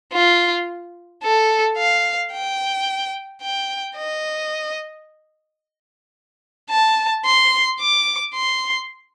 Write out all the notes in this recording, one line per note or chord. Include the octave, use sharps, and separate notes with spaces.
F4
A4
F5
G5
G5
D#5
A5
C6
D6
C6